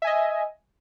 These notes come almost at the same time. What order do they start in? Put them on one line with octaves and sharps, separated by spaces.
E5 G#5 D#5